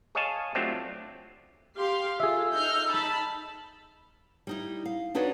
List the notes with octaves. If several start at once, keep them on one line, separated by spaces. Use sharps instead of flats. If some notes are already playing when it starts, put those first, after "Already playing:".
G#4 C#5 D#5 F5 G#5 A5
F#3 A3 C4 D4 F4 G4
G4 F5 C6
F4 G#4 A4 E5 E6
D#4 F6 G6
A5 B5
G3 D#4 E4
F5
D4 D#4 F#4 B4 C#5 D5